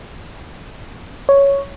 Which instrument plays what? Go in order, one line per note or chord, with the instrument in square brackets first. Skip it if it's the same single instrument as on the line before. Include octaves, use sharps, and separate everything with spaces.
[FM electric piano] C#5